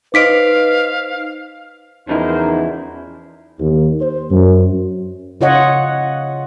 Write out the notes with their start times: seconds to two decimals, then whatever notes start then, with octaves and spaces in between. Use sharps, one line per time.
0.14 D#4 B4 C5 D#5 F5 D6 B6 D7
2.09 E2 C#3 F3 D#4 E4 A#4 C5
3.60 D#2
4.01 C5
4.31 F#2
5.41 C#3 F4 C#5 D#5 F#5